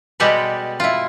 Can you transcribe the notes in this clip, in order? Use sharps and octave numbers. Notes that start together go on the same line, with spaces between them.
B2 G3 G#3 G4 A4 B4
E4 F4